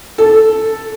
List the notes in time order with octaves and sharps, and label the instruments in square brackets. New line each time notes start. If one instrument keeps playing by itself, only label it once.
[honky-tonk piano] A4